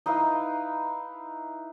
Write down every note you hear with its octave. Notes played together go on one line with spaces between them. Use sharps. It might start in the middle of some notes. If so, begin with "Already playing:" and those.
D#4 E4 B4 F5